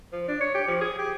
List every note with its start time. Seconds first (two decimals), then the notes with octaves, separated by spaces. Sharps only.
0.13 F3
0.28 D4
0.41 C#5
0.55 G4
0.68 F3
0.81 G#4
0.99 G4